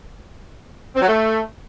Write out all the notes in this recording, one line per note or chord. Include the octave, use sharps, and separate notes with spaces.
C4
F#3
A3